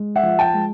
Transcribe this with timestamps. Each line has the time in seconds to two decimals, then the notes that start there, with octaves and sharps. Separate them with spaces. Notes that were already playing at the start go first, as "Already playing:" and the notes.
Already playing: G#3
0.16 E5 F#5
0.23 F3
0.39 G5 A5
0.54 G#3